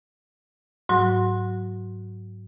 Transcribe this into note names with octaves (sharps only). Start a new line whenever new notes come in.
G#2 F#3 F#4